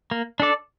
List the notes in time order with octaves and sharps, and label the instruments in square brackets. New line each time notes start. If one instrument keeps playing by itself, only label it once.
[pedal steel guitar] A#3
D4 A4 D5